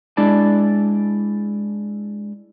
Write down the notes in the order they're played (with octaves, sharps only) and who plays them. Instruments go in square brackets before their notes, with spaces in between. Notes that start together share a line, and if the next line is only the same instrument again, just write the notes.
[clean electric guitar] G#3 D4 E4 D5 A5